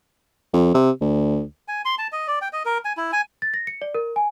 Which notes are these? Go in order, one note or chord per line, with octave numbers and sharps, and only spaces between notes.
F2
C3
D2
G#5
C6
A5
D#5
D5
G5
D#5
A#4
G#5
E4
G#5
A6
A#6
C#7
D5
A#4
G#5